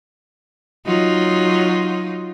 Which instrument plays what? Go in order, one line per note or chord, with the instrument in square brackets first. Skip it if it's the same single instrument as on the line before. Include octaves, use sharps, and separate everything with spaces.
[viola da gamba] F#3 D#4 F4